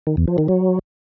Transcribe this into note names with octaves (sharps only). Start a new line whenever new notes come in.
D#3
E2
F3
D#3
F#3